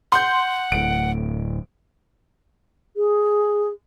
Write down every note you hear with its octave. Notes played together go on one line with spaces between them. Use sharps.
F#5 C6 G6
D1 A2 D7
G#4